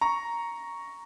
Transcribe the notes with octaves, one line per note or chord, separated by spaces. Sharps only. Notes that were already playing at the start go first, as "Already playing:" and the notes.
A#5 C#6